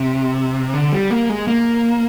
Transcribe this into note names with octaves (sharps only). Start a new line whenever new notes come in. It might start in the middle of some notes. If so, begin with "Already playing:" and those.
Already playing: C3
D3
G3
A#3
G#3
A#3